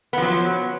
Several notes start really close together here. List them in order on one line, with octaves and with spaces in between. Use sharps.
B3 F3 F#3